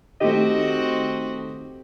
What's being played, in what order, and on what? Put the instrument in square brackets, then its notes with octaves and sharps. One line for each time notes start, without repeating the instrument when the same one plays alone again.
[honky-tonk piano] D#3 A3 [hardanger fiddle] C4 F#4 [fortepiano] G4 [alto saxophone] D#5